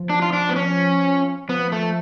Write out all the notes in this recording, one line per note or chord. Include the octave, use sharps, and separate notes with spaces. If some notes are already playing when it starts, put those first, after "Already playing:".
Already playing: F3
D4
F4
D4
B3
C#4
F3 B3
A3